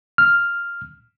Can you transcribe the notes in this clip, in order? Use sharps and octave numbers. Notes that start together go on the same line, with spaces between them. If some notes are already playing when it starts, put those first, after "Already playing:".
F6